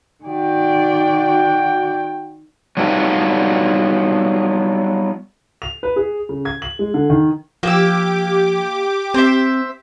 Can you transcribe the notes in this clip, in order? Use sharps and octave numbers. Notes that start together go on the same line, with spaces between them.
D#3 F#4 D5 G5
F#3 G3 B3 D4 D#4 F4
F7
B4
G#4
C#3
G#6
F#7
G#3
D3
D#3
F3 A#3 G4 D6 E6
C4 C5 E5